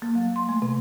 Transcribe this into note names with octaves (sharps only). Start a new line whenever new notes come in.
A#3
F#3
C6
A3
C3